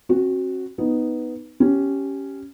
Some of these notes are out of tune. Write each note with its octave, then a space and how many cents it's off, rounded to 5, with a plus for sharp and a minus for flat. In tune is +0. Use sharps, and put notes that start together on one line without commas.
C4 +45 F#4 +0
B3 +0 D#4 +0
C#4 +0 G4 -15